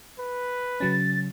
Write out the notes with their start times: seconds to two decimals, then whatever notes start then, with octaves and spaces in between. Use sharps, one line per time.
0.19 B4
0.80 C#3 F#3 C#4 A6